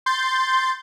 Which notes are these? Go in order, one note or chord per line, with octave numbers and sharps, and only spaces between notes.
C6 G6 A6